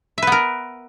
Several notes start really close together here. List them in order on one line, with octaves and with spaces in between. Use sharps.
E5 B4 B3 A#4